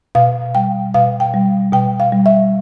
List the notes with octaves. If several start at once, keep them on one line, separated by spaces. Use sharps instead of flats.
B2 F5
G3 G5
B2 F5
G5
G3
B2 G5
F5
G3
E5